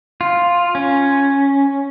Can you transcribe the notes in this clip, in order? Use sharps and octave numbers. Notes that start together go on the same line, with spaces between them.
F4
C#4